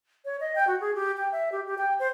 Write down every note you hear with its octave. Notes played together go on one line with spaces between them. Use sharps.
C#5
D#5
G5
F#4
G#4
G4
G5
E5
G4
G4
G5
C5